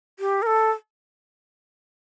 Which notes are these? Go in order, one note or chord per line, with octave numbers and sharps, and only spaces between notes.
G4
A#4
A4